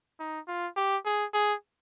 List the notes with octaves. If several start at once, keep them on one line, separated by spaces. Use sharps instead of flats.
D#4
F4
G4
G#4
G#4